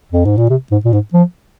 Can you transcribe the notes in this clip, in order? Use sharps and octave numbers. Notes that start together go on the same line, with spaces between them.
F2
G#2
A#2
C3
G#2
A#2
G#2
F3